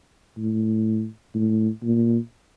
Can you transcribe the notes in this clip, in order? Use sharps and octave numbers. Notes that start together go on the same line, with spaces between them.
A2
A2
A#2